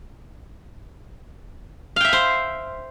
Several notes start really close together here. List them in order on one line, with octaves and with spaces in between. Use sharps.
F5 G5 E5 B5 C5